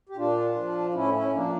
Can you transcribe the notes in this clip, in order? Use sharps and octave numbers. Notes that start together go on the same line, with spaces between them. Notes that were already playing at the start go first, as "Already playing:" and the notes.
G4
A#2 D4 F4
F3
A2 C#4 E4
C#4 E4
F3 A#3 D4